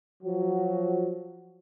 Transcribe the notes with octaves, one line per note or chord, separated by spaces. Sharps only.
F3 F#3 F#4